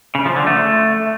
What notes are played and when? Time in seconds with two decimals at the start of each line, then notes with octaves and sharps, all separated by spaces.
0.15 C#3
0.25 F3
0.36 D3
0.47 A3